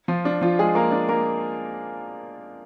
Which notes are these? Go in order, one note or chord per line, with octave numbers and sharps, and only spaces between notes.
F3 F4
D4
F3 F4
G#3 G#4
A#3 A#4
D4 D5
A#3 A#4